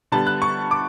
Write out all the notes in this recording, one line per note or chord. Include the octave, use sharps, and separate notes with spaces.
D3 G3 B3 A5
F#6
C#6
D6